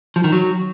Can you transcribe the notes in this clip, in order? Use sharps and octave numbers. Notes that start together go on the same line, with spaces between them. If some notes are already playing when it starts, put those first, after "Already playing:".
F3
D#3
F#3